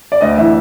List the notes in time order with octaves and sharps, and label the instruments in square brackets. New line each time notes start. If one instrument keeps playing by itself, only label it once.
[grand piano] D5
D2 D#5
E3 E5